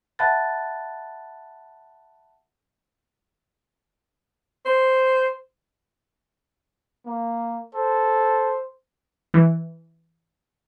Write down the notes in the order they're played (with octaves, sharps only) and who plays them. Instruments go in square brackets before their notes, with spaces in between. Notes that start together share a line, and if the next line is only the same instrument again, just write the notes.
[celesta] E5 F#5 A5 B5 F#6 A6
[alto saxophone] C5
[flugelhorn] A#3
[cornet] A4 [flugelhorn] C5
[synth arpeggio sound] E3